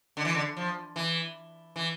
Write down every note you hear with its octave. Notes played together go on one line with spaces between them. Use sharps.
D3
E3
D3
F3
E3
E3